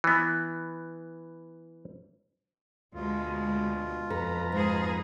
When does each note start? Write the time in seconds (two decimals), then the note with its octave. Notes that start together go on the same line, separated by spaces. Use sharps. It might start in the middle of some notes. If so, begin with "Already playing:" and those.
0.04 E3 B3
2.94 D2 B2 G#3 F4
4.10 F2 A4 B4 A#5
4.52 G#2 D#4 G#4